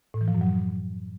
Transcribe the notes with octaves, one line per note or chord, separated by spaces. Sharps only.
A2
E3
F3
F#2
F#3